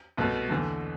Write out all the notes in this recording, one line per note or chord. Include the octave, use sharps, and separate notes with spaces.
C2 B2 A3
E2 D3 A3